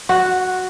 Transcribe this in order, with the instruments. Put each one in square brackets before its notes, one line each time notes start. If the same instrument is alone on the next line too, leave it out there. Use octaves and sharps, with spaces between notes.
[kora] F#4